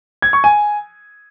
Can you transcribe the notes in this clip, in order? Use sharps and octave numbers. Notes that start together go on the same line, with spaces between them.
G#6
C#6
G#5